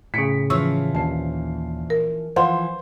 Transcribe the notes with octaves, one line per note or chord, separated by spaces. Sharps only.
A2 C#3 B6 C#7 D7
E3 F3 C#4 C#6 E6
A#1 D#2 A5 C7
A#4
E3 F3 C5 F5 F#5 C6